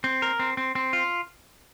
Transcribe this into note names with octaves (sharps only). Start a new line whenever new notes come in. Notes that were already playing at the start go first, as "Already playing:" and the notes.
C4
A#4
C4
C4
C4
F4